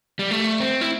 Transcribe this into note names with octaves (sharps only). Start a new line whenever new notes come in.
G3
A3
C4
E4